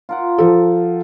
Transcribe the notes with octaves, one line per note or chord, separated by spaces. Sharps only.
F4 A#4 F#5
F3 A4